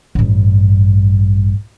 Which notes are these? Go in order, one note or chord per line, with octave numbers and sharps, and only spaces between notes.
A1 G2